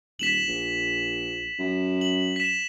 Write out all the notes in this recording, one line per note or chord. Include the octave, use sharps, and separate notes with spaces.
D#1 B6 E7 F#7
A#1
F#2
F#7
B6 E7